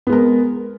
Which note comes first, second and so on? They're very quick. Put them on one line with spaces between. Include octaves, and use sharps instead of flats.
B3 G#3 A#4